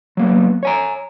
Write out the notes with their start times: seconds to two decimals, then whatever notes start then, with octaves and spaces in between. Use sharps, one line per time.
0.17 F#3 A#3 B3
0.63 C#5 G#5 A#5